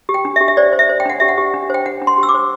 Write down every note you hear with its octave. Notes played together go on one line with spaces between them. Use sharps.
G4
G5
D4
E5
G4
E5
C5 D5
C5
E5
C5
G5
D4 F#5
G4 E5
F#5
G4
D4
C5 G5
D4 F#5
D4
C6
G4 E6
D6
C5